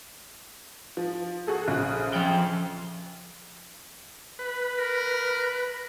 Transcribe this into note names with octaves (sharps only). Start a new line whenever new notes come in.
F3
F#4 G#4 A4
A#1 C#3 F#6
F3 G5
B4
A#4